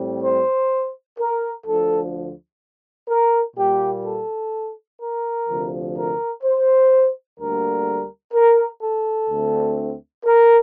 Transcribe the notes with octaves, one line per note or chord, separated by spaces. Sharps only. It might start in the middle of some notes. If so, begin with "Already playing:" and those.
Already playing: A2 G3 C4
C5
A#4
D2 D3 F3 A4
A#4
A#2 G3 A#3 G4
A4
A#4
D2 C3 F3
A#4
C5
D2 D3 G3 A#3 A#4
A#4
A4
D2 D3 A3 C4
A#4